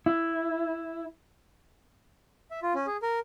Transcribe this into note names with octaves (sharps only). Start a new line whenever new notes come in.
E4
E5
F4
C#4
G#4
A#4